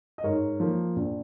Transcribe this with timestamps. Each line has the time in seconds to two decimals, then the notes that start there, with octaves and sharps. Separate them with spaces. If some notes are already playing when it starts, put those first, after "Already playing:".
0.18 D#5
0.24 G#2 A#4 C#5
0.60 F3 A#3
0.96 A#1